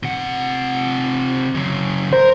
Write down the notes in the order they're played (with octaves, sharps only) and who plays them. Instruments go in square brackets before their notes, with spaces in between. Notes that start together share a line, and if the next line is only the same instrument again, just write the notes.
[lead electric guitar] C3 F#5
F#2 C#3
[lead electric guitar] A#4 [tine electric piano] C5